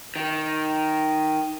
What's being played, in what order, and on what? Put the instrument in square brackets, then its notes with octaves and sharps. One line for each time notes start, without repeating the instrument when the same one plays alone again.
[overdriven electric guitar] D#3